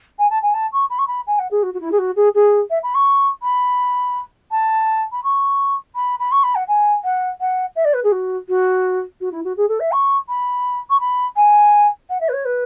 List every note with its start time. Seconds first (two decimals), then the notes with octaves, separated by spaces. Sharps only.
0.19 G#5
0.30 A5
0.42 G#5
0.54 A5
0.73 C#6
0.90 B5
0.99 C#6
1.07 B5
1.27 G#5
1.39 F#5
1.51 G#4
1.63 F#4
1.74 F#4
1.81 E4
1.92 G#4
1.98 F#4
2.16 G#4
2.35 G#4
2.70 E5
2.83 B5
2.95 C#6
3.43 B5
4.51 A5
5.12 B5
5.24 C#6
5.95 B5
6.19 B5
6.32 C#6
6.43 B5
6.55 F#5
6.68 G#5
7.04 F#5
7.40 F#5
7.76 E5
7.85 D5
7.94 B4
8.04 G#4
8.12 F#4
8.49 F#4
9.21 F#4
9.32 E4
9.44 F#4
9.57 G#4
9.69 A4
9.80 E5
9.92 C#6
10.29 B5
10.90 C#6
11.00 B5
11.36 G#5
12.10 F#5
12.21 E5
12.29 B4
12.33 C#5
12.45 B4